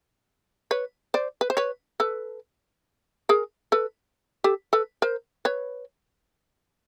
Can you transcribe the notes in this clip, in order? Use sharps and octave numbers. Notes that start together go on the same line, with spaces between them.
B4 C#5
C5 D5
B4
C5
B4 C#5
A4 B4
G#4 A#4
A4 B4
G4 A4
A4 B4
A#4 C5
B4 C#5